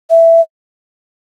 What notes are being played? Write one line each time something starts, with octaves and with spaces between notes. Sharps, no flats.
E5